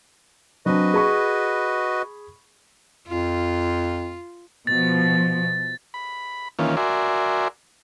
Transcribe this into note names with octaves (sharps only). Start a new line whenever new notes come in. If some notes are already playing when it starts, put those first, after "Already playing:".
F#3 C4 D4 F#4 B4 D#5
G#4 B5 C#6
F2 F4
B2 F3 A6
B5
D#3 E3 A#3 C#4 F4
F#4 A#4 D5 E5 G#5 C6